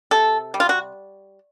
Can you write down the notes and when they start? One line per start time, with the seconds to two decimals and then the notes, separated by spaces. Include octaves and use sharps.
0.11 C3 A4
0.54 G3
0.60 F4
0.69 F#4